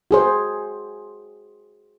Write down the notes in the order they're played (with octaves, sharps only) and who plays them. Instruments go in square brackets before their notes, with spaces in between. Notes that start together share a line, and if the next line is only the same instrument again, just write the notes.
[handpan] F#4 G#4 C5